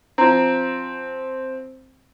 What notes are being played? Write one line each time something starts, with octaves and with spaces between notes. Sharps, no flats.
F3 C4 A#5